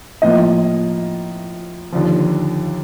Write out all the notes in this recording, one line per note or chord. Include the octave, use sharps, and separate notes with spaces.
A2 F3 A#3 D#5
D#2 D3 F3